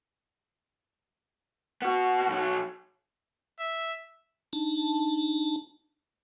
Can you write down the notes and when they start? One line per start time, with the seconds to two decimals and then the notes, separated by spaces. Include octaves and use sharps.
1.82 B3 F#4
2.28 B1 F#3
3.60 E5
4.53 D4 D#4 A5